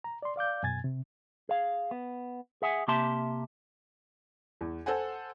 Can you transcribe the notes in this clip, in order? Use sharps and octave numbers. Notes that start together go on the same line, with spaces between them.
A#5
D5 C6
D5 F5 D6 G6
F#2 B2 G#5 G#6 A6
C3
G#4 F5
B3
G#4 E5 F#5 G#5
C3 A#3 G4 E5 A5 C6
E2
A4 C5 F#5 G#5